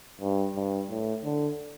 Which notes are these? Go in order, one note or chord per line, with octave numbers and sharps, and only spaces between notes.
G2
G2
A2
D3